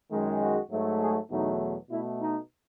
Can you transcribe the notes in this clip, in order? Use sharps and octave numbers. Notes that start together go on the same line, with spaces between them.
F#2 D#3 G#3
F#4
G#2 F#3 A3
G#4
E2 B2 F#3 A3 D#4
B2 A3 E4
D#4